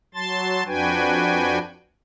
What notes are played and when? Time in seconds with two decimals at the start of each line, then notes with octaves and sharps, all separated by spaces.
0.14 F#3 A5 C6 A6
0.67 F2 D4 F#4 B4 G5 G#5